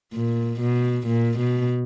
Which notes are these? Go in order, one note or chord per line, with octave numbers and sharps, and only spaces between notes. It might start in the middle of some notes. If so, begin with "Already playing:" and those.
A#2
B2
A#2
B2